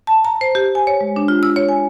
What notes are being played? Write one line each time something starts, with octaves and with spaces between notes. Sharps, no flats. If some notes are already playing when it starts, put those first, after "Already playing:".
A5
A#5
C5
G4
G#5
C#5
G#3
D4
F4
E6
C#5
G#5